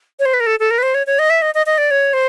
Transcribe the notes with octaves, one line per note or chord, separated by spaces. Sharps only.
C#5
C5
B4
A#4
A4
A4
A#4
B4
C5
C#5
C#5
D#5
E5
D#5
D#5
D#5
D5
C#5
C5